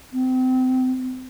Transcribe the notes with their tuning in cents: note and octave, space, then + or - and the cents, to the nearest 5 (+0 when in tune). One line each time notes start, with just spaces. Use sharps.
C4 -30